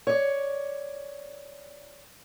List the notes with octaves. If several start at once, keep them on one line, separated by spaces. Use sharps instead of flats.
C#5 D5